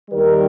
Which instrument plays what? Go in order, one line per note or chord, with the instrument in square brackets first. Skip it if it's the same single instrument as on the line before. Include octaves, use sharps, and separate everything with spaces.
[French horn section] D#2 D#3 G3 A#4